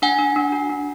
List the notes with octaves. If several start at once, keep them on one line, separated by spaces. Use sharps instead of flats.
D4 F#5 G#5
D4
D4
F#4
D4